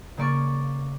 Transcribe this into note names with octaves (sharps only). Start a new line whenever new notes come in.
C#3 A#3 D5 C#6 A6